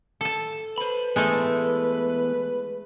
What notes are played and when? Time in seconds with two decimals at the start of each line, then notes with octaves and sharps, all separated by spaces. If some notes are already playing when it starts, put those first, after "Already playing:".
0.21 A4 A5
0.78 B4 C5 B5
1.16 E3 G#3 A3 B3 A4